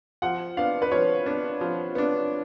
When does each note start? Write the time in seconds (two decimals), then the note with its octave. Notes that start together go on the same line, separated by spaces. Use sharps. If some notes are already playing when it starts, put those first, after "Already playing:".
0.22 F3 F#5
0.57 B3 D4 F5
0.82 B4
0.91 F3 C#5
1.26 B3 D4
1.61 F3
1.95 B3 D4